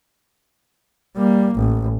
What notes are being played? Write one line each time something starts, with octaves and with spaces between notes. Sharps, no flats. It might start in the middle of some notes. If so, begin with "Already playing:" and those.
G3 A#3
A1